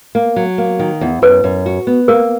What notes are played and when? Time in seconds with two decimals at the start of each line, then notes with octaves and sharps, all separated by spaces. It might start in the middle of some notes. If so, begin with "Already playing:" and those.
0.15 A#3
0.36 F#3
0.58 A#3
0.79 D#3
1.01 E2
1.22 F#2 B4
1.44 F#2
1.66 F#4
1.87 B3
2.08 A#3 A#4